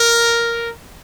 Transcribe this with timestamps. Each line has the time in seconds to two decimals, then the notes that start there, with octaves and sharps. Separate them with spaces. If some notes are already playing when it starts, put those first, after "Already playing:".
Already playing: A#4